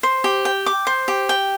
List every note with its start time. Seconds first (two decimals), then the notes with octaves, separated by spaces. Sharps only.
0.03 C5
0.24 G4
0.45 G5
0.66 D6
0.87 C5
1.08 G4
1.29 G5